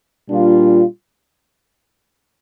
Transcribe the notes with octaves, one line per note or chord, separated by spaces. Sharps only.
A#2 G3 D4 F4